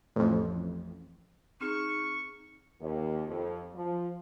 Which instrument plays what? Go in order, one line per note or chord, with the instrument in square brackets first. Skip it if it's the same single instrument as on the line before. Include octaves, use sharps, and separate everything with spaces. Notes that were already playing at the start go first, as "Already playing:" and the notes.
[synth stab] A1 F2
[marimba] C4 [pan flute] D#4 [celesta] G#4 F6 E7 [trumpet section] C#6
[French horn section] D#2
F2
F3